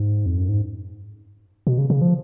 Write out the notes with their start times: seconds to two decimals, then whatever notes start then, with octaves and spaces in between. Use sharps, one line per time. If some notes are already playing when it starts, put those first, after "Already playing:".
Already playing: G#2
0.26 F2
0.38 F#2
0.49 G#2
1.67 B2
1.78 C#3
1.90 C#3
2.01 F3